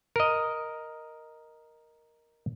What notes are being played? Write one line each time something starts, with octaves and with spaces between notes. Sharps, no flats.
A#4 D#5